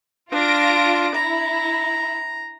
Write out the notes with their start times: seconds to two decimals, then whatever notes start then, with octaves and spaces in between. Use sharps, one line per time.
0.32 D4 F4 A#6 D7
1.15 E4 A#5